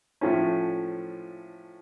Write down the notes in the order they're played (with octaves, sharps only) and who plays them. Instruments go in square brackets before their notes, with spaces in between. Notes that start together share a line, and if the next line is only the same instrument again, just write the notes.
[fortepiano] A2 F3 A3 C#4